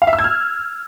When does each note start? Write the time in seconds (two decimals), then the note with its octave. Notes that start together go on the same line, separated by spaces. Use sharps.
0.02 F5
0.07 E5
0.13 E6
0.19 G#6
0.24 F6